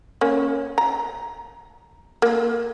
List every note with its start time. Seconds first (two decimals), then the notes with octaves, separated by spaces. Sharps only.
0.21 A#3 C#4
0.78 A#5
2.22 A#3